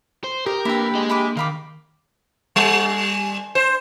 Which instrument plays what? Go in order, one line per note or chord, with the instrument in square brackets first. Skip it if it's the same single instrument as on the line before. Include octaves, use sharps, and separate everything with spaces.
[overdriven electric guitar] C5
[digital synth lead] G4 [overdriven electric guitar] A#4 [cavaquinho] D#5
[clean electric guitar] A#3 D4 G5 [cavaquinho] E4 B4
[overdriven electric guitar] G#4 D#5
[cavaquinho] E4 B5 D6
[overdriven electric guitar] D#3 [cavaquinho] F5 B5 D6
[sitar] G3
C5